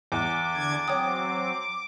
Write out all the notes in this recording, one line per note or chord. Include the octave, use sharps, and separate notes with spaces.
E2 D6
D3 D4 G#6
F#3 C4 C#5 G5 D#6